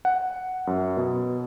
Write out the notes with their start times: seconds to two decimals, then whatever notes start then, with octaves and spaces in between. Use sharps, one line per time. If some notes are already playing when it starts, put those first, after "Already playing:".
0.05 F#5
0.67 F#2
0.97 B2